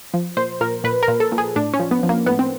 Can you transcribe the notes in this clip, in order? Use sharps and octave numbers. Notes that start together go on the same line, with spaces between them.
F3
A#2 C5
A#2 A#4
A#2 B4
A#4
A#2
A4
A#2
G#4
A2 D4
C#4
F3
B3
F3
A#3
A2 B3
C4